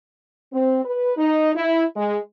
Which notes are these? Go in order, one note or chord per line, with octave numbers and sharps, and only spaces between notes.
C4
B4
D#4
E4
G#3